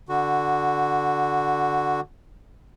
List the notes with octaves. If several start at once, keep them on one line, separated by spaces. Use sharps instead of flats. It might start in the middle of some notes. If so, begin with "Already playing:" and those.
D3 F#4